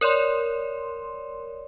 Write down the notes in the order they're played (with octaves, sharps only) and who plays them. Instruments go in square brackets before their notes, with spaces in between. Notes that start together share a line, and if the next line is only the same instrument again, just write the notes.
[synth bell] A#4 C#5 D5 C6